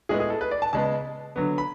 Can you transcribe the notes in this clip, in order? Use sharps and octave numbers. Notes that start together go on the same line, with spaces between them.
A2 G#3 B3 G#4
G#4
A4
B4
D5
A5
C#3 G#3 B3 A5
D3 F#3 B3
B5